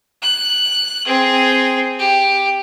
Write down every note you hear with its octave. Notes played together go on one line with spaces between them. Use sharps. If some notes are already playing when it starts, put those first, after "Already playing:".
F#6
C4 G#4
G4